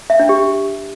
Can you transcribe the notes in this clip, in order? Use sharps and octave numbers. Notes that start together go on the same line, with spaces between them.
E5
D4
G4